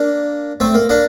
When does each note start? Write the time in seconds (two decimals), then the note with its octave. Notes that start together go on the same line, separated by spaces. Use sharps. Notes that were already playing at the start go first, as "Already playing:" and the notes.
Already playing: A#3 D4
0.60 A3 C4
0.75 A#3
0.89 A#3 D4